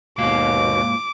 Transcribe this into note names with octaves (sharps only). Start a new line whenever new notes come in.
D#2 G#2 B2 A#3 F5 D6